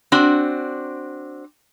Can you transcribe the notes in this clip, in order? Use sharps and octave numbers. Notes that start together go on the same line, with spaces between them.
C4 D4 F#4